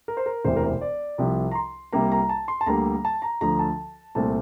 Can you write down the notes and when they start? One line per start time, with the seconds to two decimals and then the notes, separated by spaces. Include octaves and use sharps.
0.08 A#4
0.17 C5
0.26 A#4
0.45 E1 D2 C3 E3 C5
0.56 A#4
0.63 C5
0.81 D5
1.18 C2 C3 F3
1.51 A#5
1.55 C6
1.93 C2 C3 G3 A#3 A#5
2.12 A#5
2.29 A5
2.48 C6
2.61 A5
2.66 D2 D3 G3 A#3 A#5
3.05 A5
3.22 A#5
3.41 D2 D3 F3 A#5
3.59 A5
4.15 C2 A#2 A3 C4 A5